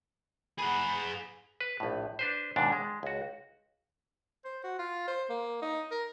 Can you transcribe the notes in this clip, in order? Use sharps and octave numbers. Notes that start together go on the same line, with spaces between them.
G#4 F#5 B5
B4
A#1 A2
D4 B4 C5
D#2 G#2 B2 D4
G#3
C#2 F#4
C5
F#4
F4
C5
A#3
D#4
A#4